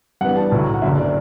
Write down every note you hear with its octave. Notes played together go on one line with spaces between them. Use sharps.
G2 E3 B3 D4 F#5
A5
B1 A2 F#3
F#5
F#1 F#2 D3 E5
D5